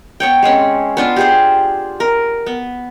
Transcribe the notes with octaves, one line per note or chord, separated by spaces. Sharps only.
B3 C#5 G5
G#3 C4 C#4
B3 D4 F4
G4 G#4 C5
A#4
B3